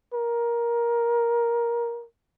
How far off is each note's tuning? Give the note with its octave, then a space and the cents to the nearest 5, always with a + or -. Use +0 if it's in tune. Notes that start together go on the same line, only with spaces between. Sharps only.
A#4 +15